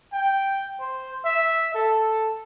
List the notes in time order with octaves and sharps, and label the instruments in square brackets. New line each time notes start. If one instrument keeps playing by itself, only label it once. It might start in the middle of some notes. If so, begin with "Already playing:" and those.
[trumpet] G5
C5
E5
A4